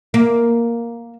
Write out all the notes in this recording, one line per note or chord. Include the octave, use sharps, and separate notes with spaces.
A#3